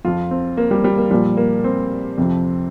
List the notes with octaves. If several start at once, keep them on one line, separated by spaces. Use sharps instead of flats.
F2 F3 F4
C4
A#3
G3
G3
A#3
A#2 F3 G3
A#3
C4
F2 C3 F3